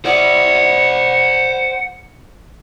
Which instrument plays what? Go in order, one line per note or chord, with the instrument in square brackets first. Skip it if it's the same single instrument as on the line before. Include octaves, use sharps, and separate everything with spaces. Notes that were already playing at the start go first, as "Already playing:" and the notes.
[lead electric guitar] C5 D5 [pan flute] F#5